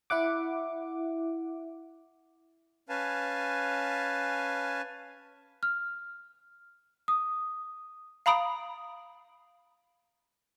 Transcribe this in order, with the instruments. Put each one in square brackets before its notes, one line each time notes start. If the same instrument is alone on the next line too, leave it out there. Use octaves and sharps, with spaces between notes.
[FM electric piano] E4 E5 F#5 D6
[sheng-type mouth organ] C#4 B4 F5 G#5 A5
[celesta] F6
D#6
[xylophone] F5 A#5 B5 D#6 D7